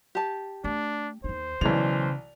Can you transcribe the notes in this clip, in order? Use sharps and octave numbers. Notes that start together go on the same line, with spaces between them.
G4 A5
A3 D4
D#2 D#4 C5
B1 C#3 E3 D5 F7